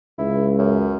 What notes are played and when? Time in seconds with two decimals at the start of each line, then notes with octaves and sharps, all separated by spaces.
0.18 C#2 E4
0.58 F#2